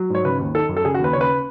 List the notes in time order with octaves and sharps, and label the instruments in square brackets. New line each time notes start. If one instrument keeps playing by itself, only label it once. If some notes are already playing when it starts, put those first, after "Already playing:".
Already playing: [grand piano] F#3
G#2 C#5
C#3 B4
D#2
D#3 A4
F#2
A4
C#3 G#4
F#4
D#2 B4
C#3 C#5
B4